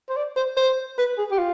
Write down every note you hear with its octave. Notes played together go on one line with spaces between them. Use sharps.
C5
D5
C5
C5
B4
G#4
G4
F4